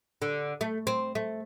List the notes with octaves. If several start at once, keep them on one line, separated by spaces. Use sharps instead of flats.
D3
A3
C4
A3